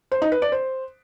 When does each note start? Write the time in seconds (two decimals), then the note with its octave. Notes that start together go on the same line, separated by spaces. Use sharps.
0.12 C5
0.22 D#4
0.32 B4
0.42 D5
0.52 C5